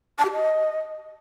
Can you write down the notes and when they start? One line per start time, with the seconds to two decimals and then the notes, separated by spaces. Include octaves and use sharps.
0.18 A5
0.25 G4
0.31 D#5